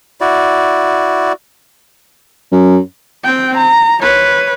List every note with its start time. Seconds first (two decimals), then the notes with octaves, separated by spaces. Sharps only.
0.21 E4 F#4 D5
2.52 F#2
3.24 C4 G5
3.57 A#5
4.02 B4 C#5